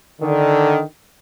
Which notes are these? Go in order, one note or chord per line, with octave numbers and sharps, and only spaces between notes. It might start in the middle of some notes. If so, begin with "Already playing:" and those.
D3 D#3